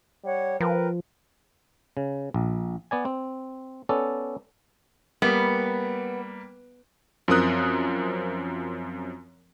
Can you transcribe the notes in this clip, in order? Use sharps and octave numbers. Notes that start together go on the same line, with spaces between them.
G3 C#5 F#5
F3 A#4 B4 G5
C#3
A#1
B3 D5 G#5
C4
B3 C#4 A4 D5
G3 A#3 B3
F#2 F3 C4 A#4 D#6 F#6